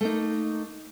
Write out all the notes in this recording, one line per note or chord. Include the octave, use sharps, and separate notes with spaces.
A3 A#3 D#4